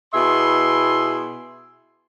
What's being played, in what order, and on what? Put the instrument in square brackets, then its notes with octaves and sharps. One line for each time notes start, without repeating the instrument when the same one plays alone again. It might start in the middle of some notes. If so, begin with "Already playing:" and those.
[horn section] B2 E4 G#4 E5 C6